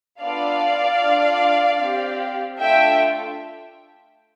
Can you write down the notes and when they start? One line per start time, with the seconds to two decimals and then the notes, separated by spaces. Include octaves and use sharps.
0.21 B3 D4 F4 A4 D5 F5
1.00 D4 F4 A4
1.80 C4 G4
2.59 A3 D4 F4 A4 E5 G5